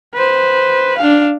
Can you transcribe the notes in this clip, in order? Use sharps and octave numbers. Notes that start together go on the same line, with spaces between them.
B4 C5
D4 F5